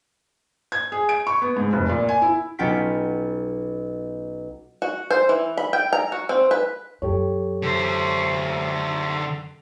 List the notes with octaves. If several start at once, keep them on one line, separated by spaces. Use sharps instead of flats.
G#6
G#4
D7
C#6
B3
G#2
F1
A#2
G#5
E4
B1 B3 C#4 F4 G5 B6
F#4
C5
E3
B5
G5
A#5
F#4
C4
B4
F#2 G4 A4 C#5
D3 C5